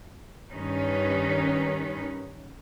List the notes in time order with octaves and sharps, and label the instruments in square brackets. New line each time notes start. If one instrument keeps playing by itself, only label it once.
[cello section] G2 D#3 C#4 D#4 B4